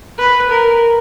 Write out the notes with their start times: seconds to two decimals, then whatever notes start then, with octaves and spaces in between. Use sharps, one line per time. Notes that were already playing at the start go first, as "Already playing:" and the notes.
0.18 B4
0.49 A#4